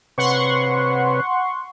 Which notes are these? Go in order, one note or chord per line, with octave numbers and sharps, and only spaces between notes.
C3 B4 C#5 F#5 C6 C#6